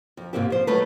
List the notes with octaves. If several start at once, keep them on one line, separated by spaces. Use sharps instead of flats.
F2
G#2 C3 G#3 A#3 C4 G4
F3 C5
D#3 F#3 A3 D#4 A4 B4